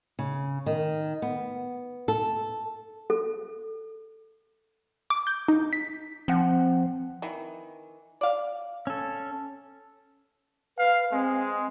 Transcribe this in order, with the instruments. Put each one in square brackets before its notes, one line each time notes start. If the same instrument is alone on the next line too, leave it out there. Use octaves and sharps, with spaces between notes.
[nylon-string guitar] C#3
D#3
B3
A4
[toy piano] A4
[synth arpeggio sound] D6
G6
D#4
B6
[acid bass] F3 [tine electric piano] C4 F#5
[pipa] D#3 E3
D5 F5
[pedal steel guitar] C#4 A4
[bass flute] B4 [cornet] F5
[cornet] G#3 [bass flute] C4